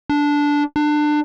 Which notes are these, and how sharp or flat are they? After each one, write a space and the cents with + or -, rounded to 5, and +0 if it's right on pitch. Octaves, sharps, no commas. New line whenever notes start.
D4 -10
D4 +25